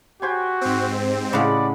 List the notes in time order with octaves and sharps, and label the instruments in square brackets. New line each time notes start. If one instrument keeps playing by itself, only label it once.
[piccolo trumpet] F#4 [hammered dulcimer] G4 C5 G#5
[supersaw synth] G#2 C4
[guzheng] A2 C#3 [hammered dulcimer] G#3 F#5 B5 [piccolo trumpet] D5